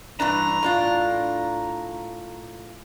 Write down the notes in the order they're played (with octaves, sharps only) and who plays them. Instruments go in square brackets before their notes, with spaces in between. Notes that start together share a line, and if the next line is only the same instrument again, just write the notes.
[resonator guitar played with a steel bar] G2 E3 D4 [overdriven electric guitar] A#5
[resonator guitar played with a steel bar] A2 D4 F4